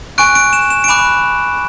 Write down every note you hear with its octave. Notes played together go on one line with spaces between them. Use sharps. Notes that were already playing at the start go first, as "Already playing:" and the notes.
G#5 C#6 F#6 D7
D7
E7
E7
D7
G#5 B5 D6 F#6 E7